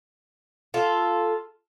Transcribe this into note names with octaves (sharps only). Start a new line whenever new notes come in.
F4 A4